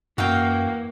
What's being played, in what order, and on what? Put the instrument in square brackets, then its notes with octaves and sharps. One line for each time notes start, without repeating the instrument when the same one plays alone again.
[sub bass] F#2 [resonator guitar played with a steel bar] E3 G5 [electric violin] A#3 [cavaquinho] F#4 F5